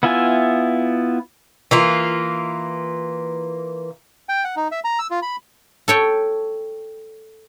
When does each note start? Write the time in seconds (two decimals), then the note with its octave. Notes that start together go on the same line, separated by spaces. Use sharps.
0.03 B3 E4 F4 E5 G#5
1.71 E3 A#3 F4
4.29 G5
4.44 F#5
4.56 D#4
4.72 E5
4.84 A#5
4.99 E6
5.11 F4
5.22 B5
5.88 A4 C#5 G5